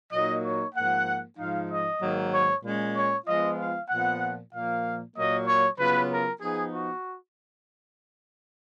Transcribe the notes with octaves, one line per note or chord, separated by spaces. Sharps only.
A#2 F#3 A#3 D#4 D#5
C#5
G#2 F3 A#3 F#5
G#2 F3 G#3 D#4 F5
D#5
G#2 D#3 F#3 A#3
C#5
A#2 G#3 C#4
C#5
F3 G#3 B3 F4 D#5
F5
A#2 F3 B3 F#5
A#2 F3 A#3 F5
A#2 F#3 A#3 D#5
C#5
C#3 F#3 B3 F4 B4
A#4
F3 B3 D#4 G#4
F#4